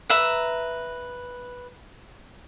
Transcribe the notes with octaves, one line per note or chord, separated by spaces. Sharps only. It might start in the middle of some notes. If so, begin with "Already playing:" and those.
B4 E5 A#5